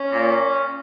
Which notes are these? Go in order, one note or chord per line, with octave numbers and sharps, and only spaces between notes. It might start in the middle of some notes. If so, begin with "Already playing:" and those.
Already playing: C#4
A#2